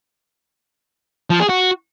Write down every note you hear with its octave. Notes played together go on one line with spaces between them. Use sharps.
F3
G#4
F#4